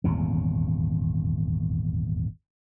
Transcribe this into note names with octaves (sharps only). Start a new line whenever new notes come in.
D#1 G#1 E2 C#3